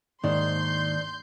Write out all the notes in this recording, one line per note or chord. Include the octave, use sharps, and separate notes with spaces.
D#2 G#2 D#3 D4 C5 C6 G6